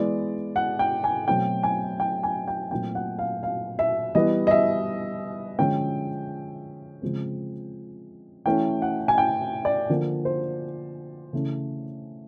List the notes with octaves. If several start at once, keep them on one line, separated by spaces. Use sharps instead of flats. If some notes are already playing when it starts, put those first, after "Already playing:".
Already playing: E3 G#3 B3 D5
F#5
G5
G#5
B2 F#3 A3 C4 G5
G#5
G5
G#5
G5
A#2 F#3 A3 C4 G5
F#5
F5
F5
E5
E3 G3 B3 D#5
D#5
E5
D3 F3 G#3 C#4 G5
C#3 F3 G#3 C4
E3 A3 C#4 G5
F#5
G#5
G5
D5
D3 F3 A#3
C5
C#3 E3 A3 C#4